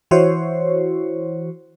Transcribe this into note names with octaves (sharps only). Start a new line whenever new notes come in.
E3 E4 F#4 C5 C#5